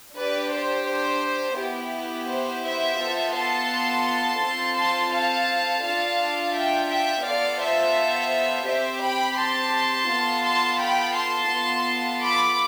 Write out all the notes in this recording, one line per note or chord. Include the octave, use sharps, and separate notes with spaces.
D4 G4 B4 D5
C5
C5
B3 E4 G4
C5
C5 E5
B3 F4 A4
A5 C6
C4 F4 A4
A5 C6
F5 A5
D4 F4 A4 F5 A5
E5 G5
E5 G5
B3 F4 A4 D5 F5
C5 E5
C4 G4 C5 E5
G5 B5
A5 C6
B3 F4 A4
A5 C6
G5 B5
A5 C6
B3 F4 A4
B5 D6